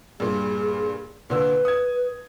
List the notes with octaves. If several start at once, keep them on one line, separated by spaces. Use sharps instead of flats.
G2 A#2 G#4
A#2 D3 B4 E6
D#6 G#6